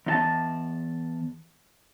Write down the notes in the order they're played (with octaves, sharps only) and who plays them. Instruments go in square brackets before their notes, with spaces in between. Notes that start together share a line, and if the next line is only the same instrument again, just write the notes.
[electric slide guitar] E2 D#4 A5